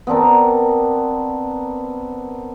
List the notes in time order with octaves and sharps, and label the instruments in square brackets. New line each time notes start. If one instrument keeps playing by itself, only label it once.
[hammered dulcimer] B3 C4 D4 A#4